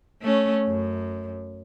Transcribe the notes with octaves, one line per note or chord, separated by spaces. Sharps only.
A3 C#4
F#2